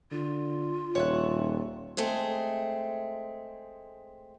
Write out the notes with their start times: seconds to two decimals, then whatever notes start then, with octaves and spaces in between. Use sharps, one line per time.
0.11 D3 F4
0.95 D#1 C#5 E5 F#5
1.97 G#3 A3 C4 G#4